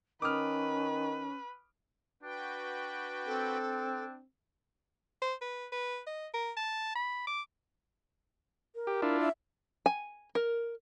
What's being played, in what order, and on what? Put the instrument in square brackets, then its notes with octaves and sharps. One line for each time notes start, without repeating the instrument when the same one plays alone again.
[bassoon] D#3 [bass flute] C#4 [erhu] B4 [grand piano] D6 D#6 F6
[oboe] D4 [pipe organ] F#4 B4 G5
[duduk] C4 [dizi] A4
[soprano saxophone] C5
B4
B4
D#5
A#4
A5
B5
D6
[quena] A#4
[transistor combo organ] G4
D4 E4 F4
[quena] E5
[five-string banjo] G#5
A#4